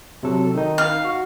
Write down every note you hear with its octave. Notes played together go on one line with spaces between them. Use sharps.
C3 F#3 A4
D#3 D#4
F5
F#4